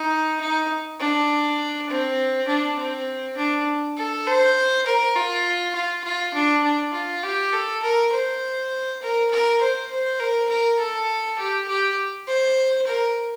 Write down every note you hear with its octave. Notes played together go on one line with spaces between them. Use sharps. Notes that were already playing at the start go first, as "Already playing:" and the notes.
Already playing: D#4
D#4
D4
C4
D4
C4
D4
A4
C5
A#4
F4
F4
F4
D4
D4
F4
G4
A4
A#4
C5
A#4
A#4
C5
C5
A#4
A#4
A4
G4
G4
C5
A#4